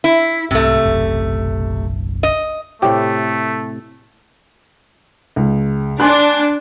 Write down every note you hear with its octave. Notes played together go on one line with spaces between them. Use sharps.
E4
C2 G#2 C3 A3
F#1 B1 F#2
D#5
A2 C3 A3 G4
C#2
D4 G#5 C6 F#6